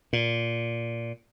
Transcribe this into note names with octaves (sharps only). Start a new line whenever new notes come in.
A#2